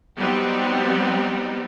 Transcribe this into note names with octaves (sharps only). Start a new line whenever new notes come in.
F#3 G3 B3 C4 D#4 G4